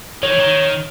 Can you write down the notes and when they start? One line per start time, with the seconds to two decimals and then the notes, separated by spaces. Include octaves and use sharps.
0.23 D#3 C#5
0.32 E3
0.40 D#3